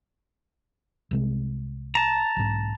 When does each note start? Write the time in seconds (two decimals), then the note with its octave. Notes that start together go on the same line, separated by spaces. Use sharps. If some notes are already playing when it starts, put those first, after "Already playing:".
1.11 C2 C3 G#3
1.95 A5 A#5
2.36 B1 G#2